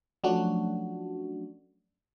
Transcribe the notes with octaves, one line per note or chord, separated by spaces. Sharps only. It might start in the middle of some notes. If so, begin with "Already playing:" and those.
F3 F#3 A3 C#4 D4 F#4